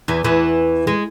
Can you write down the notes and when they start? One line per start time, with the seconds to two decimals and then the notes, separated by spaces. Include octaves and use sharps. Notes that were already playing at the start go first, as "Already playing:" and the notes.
0.08 E2 E3
0.24 E2 E3
0.87 G#3